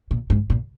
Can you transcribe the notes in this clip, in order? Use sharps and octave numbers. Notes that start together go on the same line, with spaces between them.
A#2
G#2
A#2